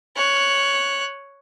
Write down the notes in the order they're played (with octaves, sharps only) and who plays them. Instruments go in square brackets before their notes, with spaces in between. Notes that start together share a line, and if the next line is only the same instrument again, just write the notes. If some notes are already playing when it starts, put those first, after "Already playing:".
[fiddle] C#5 F#6